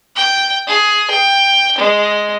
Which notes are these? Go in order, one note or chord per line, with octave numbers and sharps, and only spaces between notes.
G5
G#4
G5
G#3